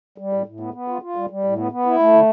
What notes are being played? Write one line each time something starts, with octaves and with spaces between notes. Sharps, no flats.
G3
A2
A2
B3
B3
F4
F4
G3
G3
A2
B3
B3
E4
A3
D3